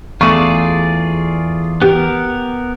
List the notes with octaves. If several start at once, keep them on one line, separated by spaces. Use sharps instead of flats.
E2 A3 F4 G#4 D5 C#6
B3 G4 A#4